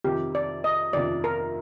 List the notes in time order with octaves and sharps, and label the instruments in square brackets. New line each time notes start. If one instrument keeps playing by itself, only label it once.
[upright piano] F2 C3 D#3 [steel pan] G4
[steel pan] D5
D#5
[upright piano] F2 C3 D#3 [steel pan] D5
[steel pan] A#4